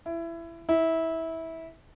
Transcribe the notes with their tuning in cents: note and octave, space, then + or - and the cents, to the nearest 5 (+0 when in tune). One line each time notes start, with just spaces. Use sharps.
E4 +20
E4 -20